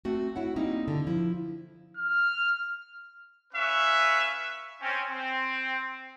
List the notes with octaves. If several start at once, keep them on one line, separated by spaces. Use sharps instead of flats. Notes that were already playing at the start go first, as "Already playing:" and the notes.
A3 C4 F#4
E4 F#4 C#5 F#5
G3 A#3 C4 D#4 E4
D3
F3 E4
F6
C#4 B4 E5 F5 C#6
C4 C#4
C4